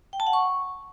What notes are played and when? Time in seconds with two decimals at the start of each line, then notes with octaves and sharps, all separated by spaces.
0.13 G5
0.20 A5
0.27 F#5
0.33 C#6